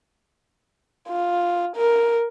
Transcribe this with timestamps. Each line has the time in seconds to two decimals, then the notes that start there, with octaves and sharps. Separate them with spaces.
1.09 F4
1.76 A#4